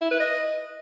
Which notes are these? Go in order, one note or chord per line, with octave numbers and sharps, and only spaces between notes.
E4
B4
D#5